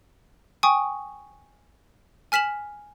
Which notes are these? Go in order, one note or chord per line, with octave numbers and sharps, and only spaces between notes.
G5 G#5 C#6 D#6
G#5 F6 B6 E7 F#7